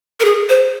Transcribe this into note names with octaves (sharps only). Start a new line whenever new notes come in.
A#4
G#4
C5